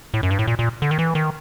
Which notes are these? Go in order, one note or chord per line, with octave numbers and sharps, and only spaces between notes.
A2
F#2
G2
A2
A#2
A#2
D3
D#3
E3
D#3